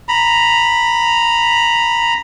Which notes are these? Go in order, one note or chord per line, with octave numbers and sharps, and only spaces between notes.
A#5 B5